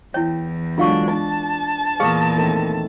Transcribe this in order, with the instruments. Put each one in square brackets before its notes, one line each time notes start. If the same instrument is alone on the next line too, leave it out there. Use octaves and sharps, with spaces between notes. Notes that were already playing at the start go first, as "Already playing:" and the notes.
[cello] E2 [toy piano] E4 C#5 [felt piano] G5
[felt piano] D3 F#3 [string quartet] G#3 D4 [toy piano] F4 F5 C#6
[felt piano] D4 [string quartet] A5
[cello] E2 A#2 [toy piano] G4 G#4 F5 [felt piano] D#6 F6
[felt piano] D#3 A3 C4